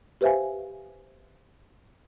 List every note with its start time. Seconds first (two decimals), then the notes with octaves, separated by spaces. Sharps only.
0.21 G4 B4 C5 E5 F5 G#5